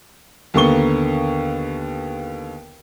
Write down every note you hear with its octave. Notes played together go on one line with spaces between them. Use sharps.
D#2 D3 A#3 B3 C#6 G7